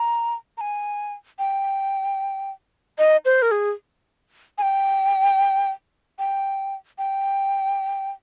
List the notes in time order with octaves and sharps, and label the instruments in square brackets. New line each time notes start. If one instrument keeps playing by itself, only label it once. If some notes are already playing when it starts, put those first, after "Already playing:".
Already playing: [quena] A#5
A#5
G#5
G5
D#5
C5
A#4
G#4
G#5
G5
G5
G5